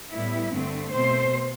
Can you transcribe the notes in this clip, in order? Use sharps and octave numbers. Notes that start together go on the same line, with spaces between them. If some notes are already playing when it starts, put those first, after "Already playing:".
A2 G3 B3 E4
G2 D3 A3 C4
B2 A3 C4 C5